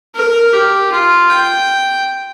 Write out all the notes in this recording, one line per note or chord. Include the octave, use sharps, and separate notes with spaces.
A#4
G4
F4
G5